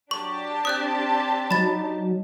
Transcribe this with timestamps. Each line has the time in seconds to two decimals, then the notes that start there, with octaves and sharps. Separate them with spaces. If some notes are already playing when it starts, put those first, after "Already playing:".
0.11 F#3 D4 G4 A5 C#6
0.65 C4 D#6 F#6 G6
1.51 F#3 D#4 B5 A6